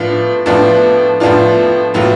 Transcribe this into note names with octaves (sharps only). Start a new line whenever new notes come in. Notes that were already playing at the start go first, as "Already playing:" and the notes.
Already playing: A2 F3 B3 D4 F4
A2 F3 B3 D4 F4
A2 F3 B3 D4 F4
A2 F#3 B3 F4